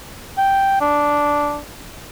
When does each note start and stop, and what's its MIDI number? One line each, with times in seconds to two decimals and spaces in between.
0.38 0.79 79
0.81 1.60 62